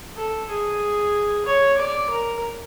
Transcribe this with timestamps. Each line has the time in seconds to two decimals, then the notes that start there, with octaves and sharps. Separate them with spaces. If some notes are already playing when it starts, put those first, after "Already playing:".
0.16 A4
0.50 G#4
1.46 C#5
1.78 D5
2.10 A#4